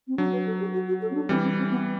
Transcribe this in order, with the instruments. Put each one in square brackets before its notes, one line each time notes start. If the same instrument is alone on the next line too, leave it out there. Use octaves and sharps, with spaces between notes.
[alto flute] C4
[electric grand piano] F#3 [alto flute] D4
[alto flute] B4
A4
G4
F#4
F#4
A4
C4
D4
[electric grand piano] E3 G3 [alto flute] C4
[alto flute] C4
C4
B3